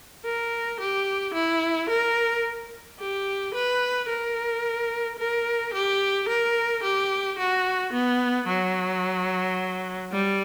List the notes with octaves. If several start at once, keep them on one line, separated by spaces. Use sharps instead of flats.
A#4
G4
E4
A#4
G4
B4
A#4
A#4
G4
A#4
G4
F#4
B3
F#3
G3